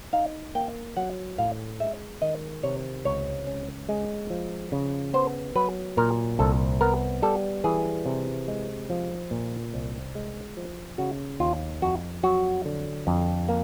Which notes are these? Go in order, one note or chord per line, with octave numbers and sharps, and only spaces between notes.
D#4 F5
A#3 G5
F#3 F#5
A2 F5
G#3 E5
D#3 D#5
C3 C#5
C#2 C#5
C#4
G#3
F3
C#3
B3 C5
F#3 B4
A#2 A#4
C2 A4
B3 A#4
G3 A4
E3 G#4
C3
G#3
F3
A#2
C2
G#3
F3
C#3 F#4
D#2 F4
F2 F#4
F#3 F#4
D3
F2
A#3